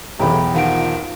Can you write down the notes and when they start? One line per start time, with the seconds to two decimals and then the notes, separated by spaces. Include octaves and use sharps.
0.20 B1 E2 A2 G4 A#5 B5
0.54 D#3 F3 F4 F#5 D7